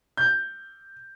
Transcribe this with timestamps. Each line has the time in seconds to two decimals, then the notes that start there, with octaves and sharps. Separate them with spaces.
0.17 G6